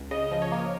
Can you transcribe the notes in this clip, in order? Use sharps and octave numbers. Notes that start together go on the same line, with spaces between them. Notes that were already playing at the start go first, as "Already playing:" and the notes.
Already playing: C#2
C#3 D#5
F3
C#5
A#3